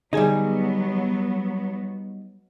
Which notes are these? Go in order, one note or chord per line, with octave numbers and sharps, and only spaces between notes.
D3 F#3 G3 B3 D#4 G#4 G#5